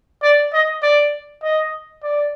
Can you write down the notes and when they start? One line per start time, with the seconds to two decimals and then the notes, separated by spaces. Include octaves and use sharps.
0.23 D5
0.53 D#5
0.83 D5
1.43 D#5
2.03 D5